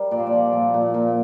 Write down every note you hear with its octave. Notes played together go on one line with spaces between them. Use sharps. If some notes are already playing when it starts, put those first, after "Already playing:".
Already playing: G3 A#4
A#2 D5
C5
D5
F3
A#2
A#2
A#2